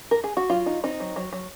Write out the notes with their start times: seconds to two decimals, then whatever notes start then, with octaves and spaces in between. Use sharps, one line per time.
0.11 A#4
0.24 G#4
0.37 F#4
0.50 F#3 F4
0.66 D#4
0.84 C4 D#4
1.00 F#3
1.16 F#3
1.33 F#3